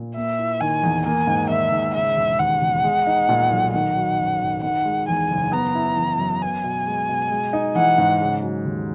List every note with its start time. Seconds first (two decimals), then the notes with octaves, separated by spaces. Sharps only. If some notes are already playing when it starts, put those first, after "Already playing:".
Already playing: A#2
0.16 A#3 E5
0.39 E4
0.61 D#3 G#5
0.83 E2
1.06 A#3 G#5
1.27 G#2
1.50 D#3 E5
1.72 G#2
1.95 C#3 E5
2.17 E1
2.39 D#2 F#5
2.61 E1
2.84 G#3
3.07 D#4
3.29 A#2
3.51 B1
3.73 D#3 F#5
3.96 F#3
4.19 F#2
4.41 G#1
4.63 D#3 F#5
4.85 G#3
5.08 E2 G#5
5.31 F#1
5.52 B3 A#5
5.75 E4
5.97 E3
6.19 F#2
6.42 B3 G#5
6.64 B2
6.86 G#3
7.09 B2
7.31 G#3
7.53 D#4
7.75 E3 F#5
7.98 G#2
8.21 C#3
8.42 F#3
8.65 D#2